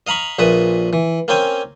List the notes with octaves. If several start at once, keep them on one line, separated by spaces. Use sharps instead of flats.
D#5 F5 A#5 B5 C#6
A#1 A#2 B4 E5 D#6
E3
A#3 C4 C#4 G5 G#5